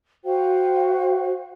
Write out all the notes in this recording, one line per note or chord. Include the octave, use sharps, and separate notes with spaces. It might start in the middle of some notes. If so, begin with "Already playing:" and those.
F#4 C5 F5 G5